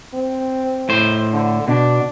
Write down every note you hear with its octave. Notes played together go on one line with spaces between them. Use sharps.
C4
A2 C5
D3
B2 D4